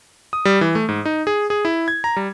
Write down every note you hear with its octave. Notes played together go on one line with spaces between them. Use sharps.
D#6
G3
E3
A3
G#2
D#4
G#4
G#4
E4
G#6
A#5
G3